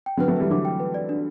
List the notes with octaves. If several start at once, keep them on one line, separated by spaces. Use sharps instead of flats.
G5
D3 F#3 B4
F#3 A3
E3 G3 E5
D3 F#3 D6
G5
B4
D5
D4